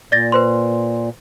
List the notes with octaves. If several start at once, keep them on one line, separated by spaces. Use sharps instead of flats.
A#2 D5 A6 A#6
B4 C5 C6